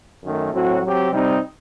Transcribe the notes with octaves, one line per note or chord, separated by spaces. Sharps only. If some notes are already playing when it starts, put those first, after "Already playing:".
F#2 D#3 A3
A2 F#3 C4 F#4
F#3 C4 G4
C3 G3 C4 D#4